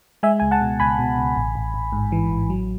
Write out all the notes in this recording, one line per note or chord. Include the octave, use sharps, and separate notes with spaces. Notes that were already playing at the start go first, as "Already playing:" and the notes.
G#3 E5 G#5
C#2 G#5
F#5 A5
B2
C#2 G#5 B5
B2
C#2
A1
A1
A1
G#2
E3
A1
F#3